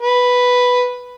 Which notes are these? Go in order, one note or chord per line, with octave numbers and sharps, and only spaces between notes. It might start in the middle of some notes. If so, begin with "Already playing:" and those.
B4